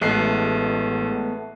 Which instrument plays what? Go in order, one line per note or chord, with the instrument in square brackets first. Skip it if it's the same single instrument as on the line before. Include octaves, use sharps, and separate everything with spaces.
[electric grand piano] A1 F#6 C7 [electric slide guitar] G#3 A3 B3